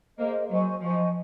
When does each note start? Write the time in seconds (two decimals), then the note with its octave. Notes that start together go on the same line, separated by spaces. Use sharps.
0.18 A#3 G#4 C5 D#5
0.50 F#3 C5 D#5 G#5 C#6
0.82 F3 C5 D#5 G#5 C#6